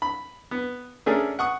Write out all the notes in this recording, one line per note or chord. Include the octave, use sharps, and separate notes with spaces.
B5
B3
A3 C#4 D4 G#4 A#4
F#5 C#6 D#6